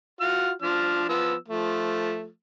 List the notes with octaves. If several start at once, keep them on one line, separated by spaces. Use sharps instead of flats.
F4 F#4 F6
F3 D4 F6
F3 B3 E6
F3 A3